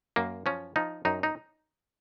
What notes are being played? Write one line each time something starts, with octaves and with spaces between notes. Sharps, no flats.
F#2 A#3
F3 C#4
F3 D#4
F#2 D#4
D#4